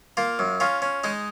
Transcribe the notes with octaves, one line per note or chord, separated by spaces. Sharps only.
A#3 F4
F#2
C#4 F4
C#4
G#3 D#4